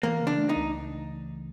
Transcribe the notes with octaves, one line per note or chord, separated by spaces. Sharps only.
E3 A#3
C#3
D4
A3
D#4
C#2